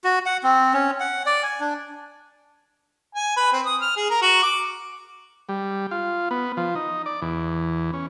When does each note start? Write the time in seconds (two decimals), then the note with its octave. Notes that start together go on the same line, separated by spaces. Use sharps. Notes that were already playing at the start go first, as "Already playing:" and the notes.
0.04 F#4
0.26 F#5
0.43 C4
0.74 C#4
1.00 F#5
1.26 D5
1.43 G#5
1.60 D4
3.15 G#5
3.37 B4
3.53 C4
3.65 D#6
3.82 F6
3.97 G#4
4.10 A#4
4.22 F#4
4.43 D6
5.49 G3
5.91 F4
6.31 B3
6.57 F3
6.75 D#4
7.06 D5
7.22 E2
7.93 C#4